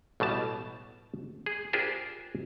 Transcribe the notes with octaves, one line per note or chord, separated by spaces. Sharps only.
A1 B2 G3 A5
G#4
D4 F4 G4 G#4 A#4 C5